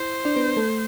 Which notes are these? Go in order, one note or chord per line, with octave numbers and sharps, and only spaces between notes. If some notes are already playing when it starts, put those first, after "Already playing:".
Already playing: E4 C5
D4 D5
B3 B4
A3 A4